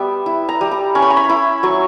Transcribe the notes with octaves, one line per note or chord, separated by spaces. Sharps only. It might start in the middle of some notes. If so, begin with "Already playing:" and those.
Already playing: G3 B3 E5
E4
A#5
G3
A#5
C#4 C#6
B5
A#5
B5
E4 B5
F#3 C#6